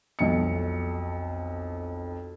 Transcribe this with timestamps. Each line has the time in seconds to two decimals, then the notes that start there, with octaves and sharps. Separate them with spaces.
0.19 B1 F2 C#7